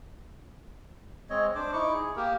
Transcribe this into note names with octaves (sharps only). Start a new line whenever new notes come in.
G#3 C4 C#5 D#5
D4 C5 D6
D#4 E4 C#6 D6
G#4
A#3 G4 A#4